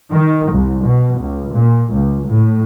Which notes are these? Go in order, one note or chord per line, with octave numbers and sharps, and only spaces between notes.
D#3
C2
B2
C#2
A#2
C#2
A2